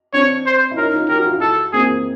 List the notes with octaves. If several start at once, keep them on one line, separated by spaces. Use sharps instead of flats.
C4 D4 C#5
C5
E4
C#4 D#4 A#4
D#4 F4
G4 A#4
F#4
F4
E4 F#4
A4
A#3 C4 G#4